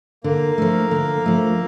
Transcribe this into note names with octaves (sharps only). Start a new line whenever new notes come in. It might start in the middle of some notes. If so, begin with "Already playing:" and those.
D3 A#3
F3 A3
D3
F3 A3